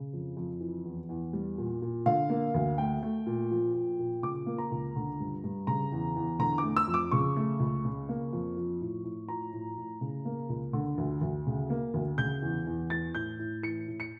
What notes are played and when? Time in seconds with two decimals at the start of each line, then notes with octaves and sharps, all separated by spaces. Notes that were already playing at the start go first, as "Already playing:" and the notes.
Already playing: C#3
0.13 F2
0.37 F2
0.60 E3
0.84 E2
1.09 E2
1.33 G3
1.58 A#2
1.82 A#2
2.06 D3 F5
2.30 A#3
2.54 D2
2.78 A3 G5
3.03 A3
3.27 A#2
3.51 F3
3.74 A#2
3.99 A#2
4.23 C#3 D6
4.46 A#3
4.58 A#5
4.71 C#2
4.96 D3
5.20 G2
5.44 G2
5.67 C#3 A#5
5.92 E2
6.16 E2
6.39 D3 A#5
6.58 D6
6.63 A3
6.77 E6
6.88 F2
6.94 D6
7.11 C#3 C#6
7.36 A3
7.60 C#2
7.85 C#3
8.09 A#3
8.33 F2
8.57 F3
8.81 A2
9.04 A2
9.29 F3 A#5
9.53 A2
9.78 A2
10.01 C#3
10.25 A#3
10.49 C#2
10.73 D3
10.98 D2
11.21 D2
11.47 C#3
11.70 A#3
11.94 D2
12.18 C#3 G6
12.42 E2
12.67 E2
12.90 E3 A6
13.15 A2 G6
13.39 A2
13.63 E3 C#7
13.88 A2
14.00 C#7